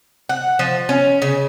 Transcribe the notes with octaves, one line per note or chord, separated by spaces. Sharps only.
F#5
F3
C#4
C#3